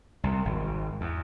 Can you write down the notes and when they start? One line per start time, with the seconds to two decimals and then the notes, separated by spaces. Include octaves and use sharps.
0.24 C2
0.45 G#1
1.01 E2